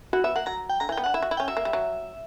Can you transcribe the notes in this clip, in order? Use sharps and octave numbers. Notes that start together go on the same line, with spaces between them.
E4 F#4
B3 E5
A#3 F#5
F#3 A#5
G5
D3 A#5
E3
G5
B3
D4 F#5
E4 E5
F#4
E4
C#4 G5
F#3 E5
A#3
G3
F#3